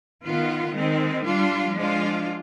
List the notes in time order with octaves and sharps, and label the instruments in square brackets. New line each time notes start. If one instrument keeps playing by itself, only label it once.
[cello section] D#3 B3 F4
D#3 G#3 C4
G3 D4 F4
F3 G#3 D4 F4